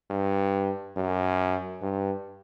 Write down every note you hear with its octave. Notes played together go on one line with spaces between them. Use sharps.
G2
F#2
G2